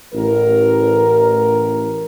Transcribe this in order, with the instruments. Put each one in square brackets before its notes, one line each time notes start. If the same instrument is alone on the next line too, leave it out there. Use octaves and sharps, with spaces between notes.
[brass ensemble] A1 A#4